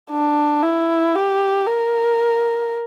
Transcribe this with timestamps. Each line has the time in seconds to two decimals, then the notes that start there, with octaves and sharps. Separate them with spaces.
0.11 D4
0.63 E4
1.15 G4
1.66 A#4